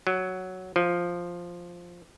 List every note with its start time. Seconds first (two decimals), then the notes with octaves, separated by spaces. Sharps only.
0.07 F#3
0.76 F3